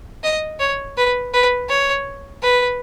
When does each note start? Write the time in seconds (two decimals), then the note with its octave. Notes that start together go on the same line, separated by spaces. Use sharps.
0.24 D#5
0.59 C#5
0.97 B4
1.33 B4
1.69 C#5
2.42 B4